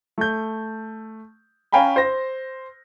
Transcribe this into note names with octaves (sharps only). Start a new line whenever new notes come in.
A3 G6
C#4 F5 G5 G#5 A#5 B5
C5 A#6